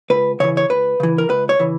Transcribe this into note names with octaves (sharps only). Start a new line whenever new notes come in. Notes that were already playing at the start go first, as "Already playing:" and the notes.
C#2 B4
C#3 E3 C#5
C#5
C#2 B4
C#3 E3
A#4
C#2 B4
C#5
C#3 E3